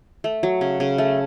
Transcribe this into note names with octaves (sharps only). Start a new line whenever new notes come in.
A3
F#3
C#3
C#3
A3